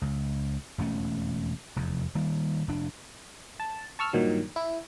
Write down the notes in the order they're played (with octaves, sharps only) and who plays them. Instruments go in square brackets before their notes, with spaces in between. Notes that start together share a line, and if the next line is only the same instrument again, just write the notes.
[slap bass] C#2
E1 F2 A3 C#4
F1 E2
D#3 G3 A#3
F1 D4
[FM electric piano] A5
A5 C#6 E6 F6
G2 A#2 D#3 F#3
E4